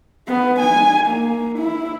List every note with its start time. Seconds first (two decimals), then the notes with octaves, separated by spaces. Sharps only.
0.27 B3
0.60 G#5
1.07 A#3
1.59 E4